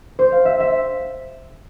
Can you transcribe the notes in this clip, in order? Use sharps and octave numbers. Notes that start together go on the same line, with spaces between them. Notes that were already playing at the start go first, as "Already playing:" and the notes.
C5
F5
E5
E5